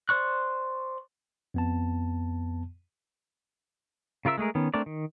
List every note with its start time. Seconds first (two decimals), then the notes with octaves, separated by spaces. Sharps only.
0.09 C5 D5 C#6 F#6
1.54 F2 B3 A5
4.25 C#3 F4 A#4 E5 E6
4.38 G#3 A3 G#4 A#4
4.55 D#3 B3 C#4
4.74 A3 C4 D4 A#4 D5
4.86 D#3